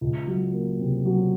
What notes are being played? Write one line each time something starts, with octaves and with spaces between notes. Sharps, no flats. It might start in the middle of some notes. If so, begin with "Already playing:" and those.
C#2
F#3
A#3
C3
F#3